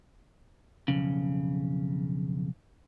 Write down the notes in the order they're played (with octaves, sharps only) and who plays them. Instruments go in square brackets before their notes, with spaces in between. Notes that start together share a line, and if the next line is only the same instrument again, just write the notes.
[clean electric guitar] B1 F2 C#3